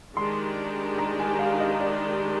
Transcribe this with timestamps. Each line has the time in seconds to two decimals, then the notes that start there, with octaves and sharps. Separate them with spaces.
0.17 D#3 G#3 D4 G4 C6
0.98 A#5
1.19 G#5
1.39 F5
1.60 D#5
1.80 D5